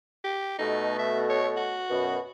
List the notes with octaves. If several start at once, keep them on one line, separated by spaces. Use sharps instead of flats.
G4
B2 A3 D#4
E5
C#5
F#4
F#2 B2